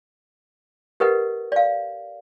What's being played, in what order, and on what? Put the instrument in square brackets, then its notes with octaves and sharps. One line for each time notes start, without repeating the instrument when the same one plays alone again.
[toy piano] G4 A#4 B4 D#5 F#5
D5 F5